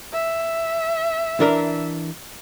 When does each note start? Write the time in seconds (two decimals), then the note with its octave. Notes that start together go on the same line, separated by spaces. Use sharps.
0.13 E5
1.40 E3 D4 A#4